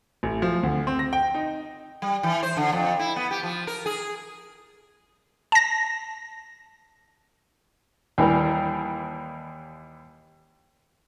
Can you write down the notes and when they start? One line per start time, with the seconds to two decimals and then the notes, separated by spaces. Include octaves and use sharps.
0.23 A1
0.42 F3
0.63 D2
0.87 C4
0.99 A#6
1.13 G5
1.35 D#4
2.02 G3
2.23 E3
2.43 C5
2.57 D3
2.72 F2
2.99 E4
3.16 B3
3.31 G4
3.43 F3
3.67 A#4
3.86 G#4
5.52 A5 A#6
8.18 D#2 E3 G3 A#4